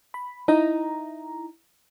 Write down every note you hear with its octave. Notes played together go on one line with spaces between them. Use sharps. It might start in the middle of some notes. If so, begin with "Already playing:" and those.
B5
D#4 E4 A#5